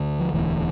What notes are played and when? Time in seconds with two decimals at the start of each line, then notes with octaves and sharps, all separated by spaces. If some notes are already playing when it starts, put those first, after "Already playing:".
Already playing: D2 D3
0.19 F3
0.33 E1 D2 D3 E3